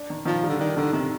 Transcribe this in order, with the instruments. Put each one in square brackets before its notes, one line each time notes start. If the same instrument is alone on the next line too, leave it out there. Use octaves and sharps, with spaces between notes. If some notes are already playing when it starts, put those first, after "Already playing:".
Already playing: [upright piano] D4
D#3
[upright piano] D#3 [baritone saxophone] F3
[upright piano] G3
[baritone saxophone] D3
[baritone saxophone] D#3 [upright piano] D4
[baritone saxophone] D3 [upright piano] D#3
[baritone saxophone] C3 [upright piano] D#3